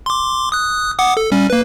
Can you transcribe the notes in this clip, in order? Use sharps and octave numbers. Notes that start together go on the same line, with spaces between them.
C6 D6
D#6 F#6
F#5 D6 D#6
A4
G3 C#4
A#3 B4